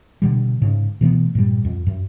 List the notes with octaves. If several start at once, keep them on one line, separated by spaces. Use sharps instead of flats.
B2 D3 G3
G#2 C#3
B2 E3 A3 B3
G2 A#2 G3
F2
F#2